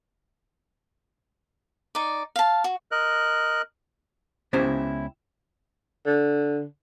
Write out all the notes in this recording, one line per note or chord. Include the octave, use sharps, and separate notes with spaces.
D#4 D5
F5 A5
F#4
A#4 D#5 F#6
C#2 B3 C#4 E4 G4 C5
D3